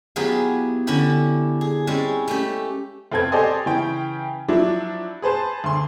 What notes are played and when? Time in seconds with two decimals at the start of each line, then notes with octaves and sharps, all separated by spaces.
0.16 F#3 B3 E4 F4 G4 G#4
0.87 D3 C#4 D4 E4 G4
1.61 G#4
1.87 G3 G#3 C4 C#4
2.28 A3 C#4 G4
3.12 F1 C4 A4 B4 G#6
3.32 G4 A4 C5 D5 D#5 G#5
3.66 C#3 E3 C#4 G5
4.48 F3 F#3 D4 E4
5.22 G#4 B4 C5 A5
5.64 D2 C6